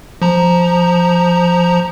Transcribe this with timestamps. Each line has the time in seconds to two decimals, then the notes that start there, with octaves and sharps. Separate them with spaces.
0.22 F3 A#5